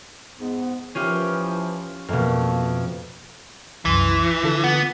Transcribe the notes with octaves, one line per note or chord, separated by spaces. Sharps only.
G#2 B3
E3 F3 C#4 F4 G4
F2 B2 A3 A#3
C2 F#2 E3 C6
D3 F4 A4
B3